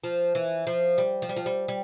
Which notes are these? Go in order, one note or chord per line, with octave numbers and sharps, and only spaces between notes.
F3
E3
F3
G3
F3
G3
F3
G3
G3